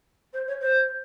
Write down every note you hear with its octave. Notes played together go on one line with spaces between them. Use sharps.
C5
C#5
C5